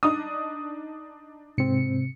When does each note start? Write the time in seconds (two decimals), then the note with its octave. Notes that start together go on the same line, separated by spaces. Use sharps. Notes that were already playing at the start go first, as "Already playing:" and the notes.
0.03 D4 D#4 D#6
1.58 G#2 C3 C4 C#7